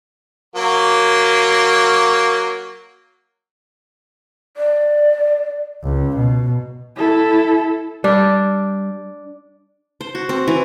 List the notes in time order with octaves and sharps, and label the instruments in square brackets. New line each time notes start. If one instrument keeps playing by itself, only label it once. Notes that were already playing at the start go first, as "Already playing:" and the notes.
[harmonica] F#3 A#3
[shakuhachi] D5
[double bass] C#2
B2
[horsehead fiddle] E4 A4
[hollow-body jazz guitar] G3 [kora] D4
[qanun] C5
F#4
C4
E3